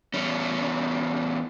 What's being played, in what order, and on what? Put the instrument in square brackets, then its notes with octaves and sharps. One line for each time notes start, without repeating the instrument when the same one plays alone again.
[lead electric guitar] E2 C#4